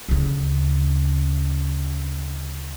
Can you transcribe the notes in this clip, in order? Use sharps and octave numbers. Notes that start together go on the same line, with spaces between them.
D2 C#3